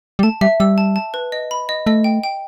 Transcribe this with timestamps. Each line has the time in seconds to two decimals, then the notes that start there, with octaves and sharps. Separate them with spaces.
0.19 G3
0.23 A3 A5
0.41 G3 E5
0.60 G3 E6
0.78 A5
0.96 A5
1.14 B4
1.32 D#5
1.51 B5
1.69 D#5
1.86 A3 D#5
2.04 G5
2.23 G5